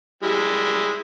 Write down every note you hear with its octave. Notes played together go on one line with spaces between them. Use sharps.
G3 G#3 E4